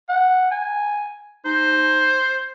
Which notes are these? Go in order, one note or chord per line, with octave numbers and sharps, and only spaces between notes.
F#5
G#5
D#4 C5